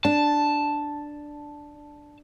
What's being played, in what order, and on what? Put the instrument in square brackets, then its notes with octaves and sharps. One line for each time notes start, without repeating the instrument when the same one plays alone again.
[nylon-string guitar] D4 [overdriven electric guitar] A5